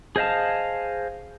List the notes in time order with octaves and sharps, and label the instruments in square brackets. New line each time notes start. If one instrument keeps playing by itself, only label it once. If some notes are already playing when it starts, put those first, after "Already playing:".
[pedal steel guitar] G#4 C5 D#5 F5 A5